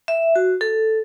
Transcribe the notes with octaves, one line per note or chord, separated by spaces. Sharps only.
E5
F#4
A4